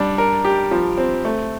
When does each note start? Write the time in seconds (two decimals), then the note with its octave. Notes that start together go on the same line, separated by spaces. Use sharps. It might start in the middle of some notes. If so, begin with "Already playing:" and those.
Already playing: G3 D4
0.18 A#4
0.45 G4
0.71 F3
0.98 C4
1.25 A3